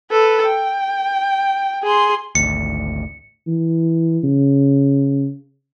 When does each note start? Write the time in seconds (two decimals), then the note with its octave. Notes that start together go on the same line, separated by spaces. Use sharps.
0.11 A4 B4
0.47 G5
1.83 G#4 C6
2.35 G#1 D2 C#7
3.48 E3
4.24 C#3